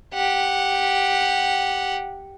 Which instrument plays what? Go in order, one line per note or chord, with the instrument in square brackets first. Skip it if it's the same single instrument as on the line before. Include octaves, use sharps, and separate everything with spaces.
[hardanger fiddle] G4 F#5